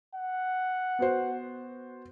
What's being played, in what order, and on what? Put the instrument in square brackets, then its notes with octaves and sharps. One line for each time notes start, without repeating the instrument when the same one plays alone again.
[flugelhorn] F#5
[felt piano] B3 F#4 C5